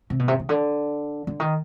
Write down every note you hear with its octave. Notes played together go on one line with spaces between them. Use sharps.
C3
B2
C3
C#3
D3
D3
D#3